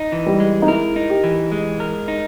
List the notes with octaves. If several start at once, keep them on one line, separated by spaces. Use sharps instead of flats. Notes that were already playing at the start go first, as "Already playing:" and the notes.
Already playing: D#4
E3
G3
G#3
D#4
E4 A#4
D#4
G4
E3
G#3
A#4
D#4